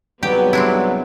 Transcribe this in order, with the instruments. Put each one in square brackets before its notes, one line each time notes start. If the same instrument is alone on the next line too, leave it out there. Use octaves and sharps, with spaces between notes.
[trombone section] C2 G#2 F#3 [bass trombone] G3 [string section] B3 [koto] G4
[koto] C4 D4 E4